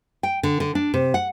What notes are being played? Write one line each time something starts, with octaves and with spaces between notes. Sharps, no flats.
G5
D3
D3
D4
C3
F#5